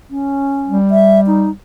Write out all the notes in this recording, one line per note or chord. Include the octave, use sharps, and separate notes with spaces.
C#4
G3
E5
D#4